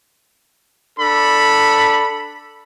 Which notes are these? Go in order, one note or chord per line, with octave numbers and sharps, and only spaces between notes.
D4 A4 B5